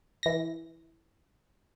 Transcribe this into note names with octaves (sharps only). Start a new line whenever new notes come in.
E3 A#6